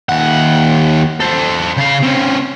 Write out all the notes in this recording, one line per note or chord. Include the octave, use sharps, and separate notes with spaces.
D#2 F#5
A4 C5
C#3 F5
C4 C#4